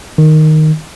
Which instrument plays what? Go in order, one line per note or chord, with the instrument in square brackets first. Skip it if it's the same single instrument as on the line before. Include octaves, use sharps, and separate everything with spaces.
[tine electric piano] D#3